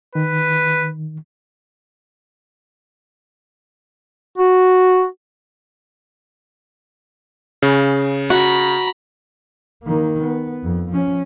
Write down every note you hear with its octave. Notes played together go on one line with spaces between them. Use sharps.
D#3 B4
F#4
C#3
F#4 A#5 B5
D#3 A#3
B3
F2
F3 C#4